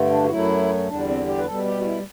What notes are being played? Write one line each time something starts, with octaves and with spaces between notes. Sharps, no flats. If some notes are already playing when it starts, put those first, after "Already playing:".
Already playing: G2 D3 A3
D4
F#4
F#2 F#3 A3 E4
E2 D3 G3 D4
C4
G4
B4
B2 G3 A4
G4
F#4
E4